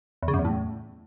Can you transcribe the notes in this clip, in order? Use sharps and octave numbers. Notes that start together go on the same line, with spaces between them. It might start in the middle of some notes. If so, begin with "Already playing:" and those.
E2
C#3
F#2
E2
A2